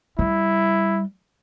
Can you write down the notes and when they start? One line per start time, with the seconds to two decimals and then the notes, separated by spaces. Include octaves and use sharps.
0.19 G3 E4